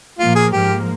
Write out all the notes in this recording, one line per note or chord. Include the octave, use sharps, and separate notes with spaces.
A#2 F3 A#3 F4
G#4
G#2 F3 A#3 G4